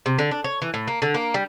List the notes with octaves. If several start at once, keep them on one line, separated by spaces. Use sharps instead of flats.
C3
D3
D4
C#5
E3
A2
A#3
D3
A#3
G3